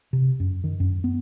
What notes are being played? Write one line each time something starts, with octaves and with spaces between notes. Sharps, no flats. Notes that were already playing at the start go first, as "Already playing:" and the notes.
C3
F#2
D#3
F#2
B3